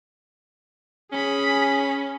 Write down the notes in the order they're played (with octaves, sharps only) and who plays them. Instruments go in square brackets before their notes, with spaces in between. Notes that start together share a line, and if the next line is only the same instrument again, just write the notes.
[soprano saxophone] C#4 [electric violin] G#4 B5